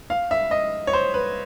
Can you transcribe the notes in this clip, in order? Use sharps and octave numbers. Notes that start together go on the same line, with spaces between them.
F5
E5
D#5
C#5
C5
B4